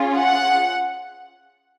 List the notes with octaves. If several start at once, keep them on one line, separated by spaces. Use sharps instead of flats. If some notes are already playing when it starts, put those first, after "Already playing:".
Already playing: C#4 F4 G#4
F#5